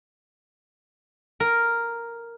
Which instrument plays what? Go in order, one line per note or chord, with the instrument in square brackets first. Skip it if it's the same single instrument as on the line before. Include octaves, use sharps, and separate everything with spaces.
[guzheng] A#4